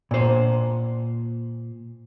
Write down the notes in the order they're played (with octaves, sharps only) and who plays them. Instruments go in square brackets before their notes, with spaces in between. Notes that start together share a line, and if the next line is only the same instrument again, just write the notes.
[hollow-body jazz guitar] A#2 C5